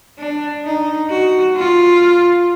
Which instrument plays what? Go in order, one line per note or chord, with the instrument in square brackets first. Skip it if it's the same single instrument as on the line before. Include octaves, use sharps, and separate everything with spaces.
[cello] D4
D#4
F#4
F4